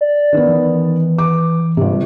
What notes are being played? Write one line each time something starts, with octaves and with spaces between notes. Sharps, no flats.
D5
D#3 B3
E3
D6
G1 C3